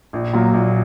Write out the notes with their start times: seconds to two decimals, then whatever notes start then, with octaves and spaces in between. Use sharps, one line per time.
0.13 A#1
0.33 A#2 F#3
0.53 A#1